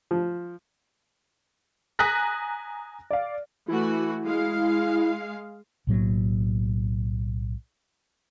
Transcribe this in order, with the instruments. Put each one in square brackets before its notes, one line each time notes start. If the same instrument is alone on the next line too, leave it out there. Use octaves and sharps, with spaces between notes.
[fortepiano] F3
[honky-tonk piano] G#5 A#5 D#6 F#6 A#6 B6
D5 F5
[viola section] E3 A3 F#4 [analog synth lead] E4
[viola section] G#3 F5
[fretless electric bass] B1 A2 F#3 A#3